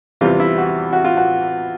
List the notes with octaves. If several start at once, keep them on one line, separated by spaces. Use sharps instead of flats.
E2 C3 E3 G3 F4
E4
F#4
F#4
F4
F#4